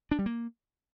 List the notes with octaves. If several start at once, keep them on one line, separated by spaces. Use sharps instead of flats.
D4
G3
A#3